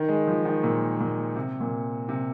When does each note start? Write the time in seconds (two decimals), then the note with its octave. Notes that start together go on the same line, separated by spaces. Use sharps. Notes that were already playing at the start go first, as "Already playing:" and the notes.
Already playing: D#3
0.09 G#3
0.27 F3
0.45 D#3
0.63 A#2
1.00 A#2
1.36 C3
1.61 A#2
2.09 C3